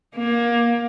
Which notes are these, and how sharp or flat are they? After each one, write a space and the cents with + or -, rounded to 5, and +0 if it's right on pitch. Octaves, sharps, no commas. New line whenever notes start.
A#3 +20